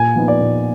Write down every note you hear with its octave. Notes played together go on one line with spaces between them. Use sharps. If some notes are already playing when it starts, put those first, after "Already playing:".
Already playing: A#2 G#5
F3 B3 D#4
D5
A#2